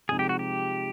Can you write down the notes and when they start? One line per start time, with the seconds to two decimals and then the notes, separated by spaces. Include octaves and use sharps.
0.09 C3 F3 G#3 C4 D#4 G#4
0.19 G4
0.29 F#4
0.39 G4